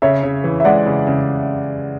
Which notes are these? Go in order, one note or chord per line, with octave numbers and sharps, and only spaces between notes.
C#3 C#5 E5
C#3
E3
E5
G#3 D5 F#5
C#3
C#3